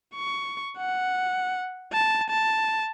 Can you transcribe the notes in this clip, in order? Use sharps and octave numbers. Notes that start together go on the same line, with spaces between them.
C#6
F#5
A5
A5